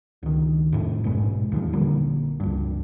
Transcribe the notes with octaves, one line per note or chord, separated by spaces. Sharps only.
C#2 D#3
F2 A2
A#1 G#2 B2 G#3
D#2 E3 F3
A#1 D3 G3 A#3
C#2 G2